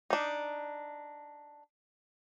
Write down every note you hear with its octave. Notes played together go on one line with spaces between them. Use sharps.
D4 D#4